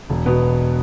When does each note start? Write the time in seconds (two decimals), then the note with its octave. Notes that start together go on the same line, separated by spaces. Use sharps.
0.10 E1
0.26 B2 B3